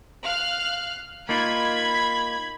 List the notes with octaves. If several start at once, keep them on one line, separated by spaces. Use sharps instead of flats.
F5 F6 F#6
A#3 D#4 F4 B5 G#6